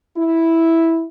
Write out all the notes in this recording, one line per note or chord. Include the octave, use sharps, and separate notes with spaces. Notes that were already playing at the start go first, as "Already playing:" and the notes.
E4